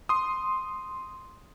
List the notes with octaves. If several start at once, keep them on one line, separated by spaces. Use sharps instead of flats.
C6 D#6